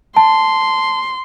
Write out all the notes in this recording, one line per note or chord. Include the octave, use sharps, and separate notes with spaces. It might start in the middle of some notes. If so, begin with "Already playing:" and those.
A5 C6